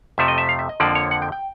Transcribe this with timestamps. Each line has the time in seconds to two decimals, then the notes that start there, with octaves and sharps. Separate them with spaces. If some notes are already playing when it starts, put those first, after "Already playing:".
0.18 F2 C3 F3 A3 E5
0.28 D#5
0.38 E5
0.49 F5
0.59 E5
0.69 D#5
0.80 F2 D3 F3 A#3 D5
0.95 C#5
1.11 F#5
1.22 G5
1.32 G5